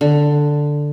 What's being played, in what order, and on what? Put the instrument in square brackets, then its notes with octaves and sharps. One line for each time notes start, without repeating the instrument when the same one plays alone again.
[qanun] D3